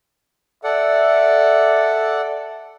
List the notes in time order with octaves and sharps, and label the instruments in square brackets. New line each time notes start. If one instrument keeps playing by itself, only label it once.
[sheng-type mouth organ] A4 D5 F#5 [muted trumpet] E5